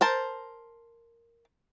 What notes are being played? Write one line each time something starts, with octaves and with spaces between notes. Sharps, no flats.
A#4 C5 A5